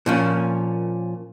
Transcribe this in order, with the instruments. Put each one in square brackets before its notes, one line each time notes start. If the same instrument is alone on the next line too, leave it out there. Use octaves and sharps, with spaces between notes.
[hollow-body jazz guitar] A#2 F3 C#4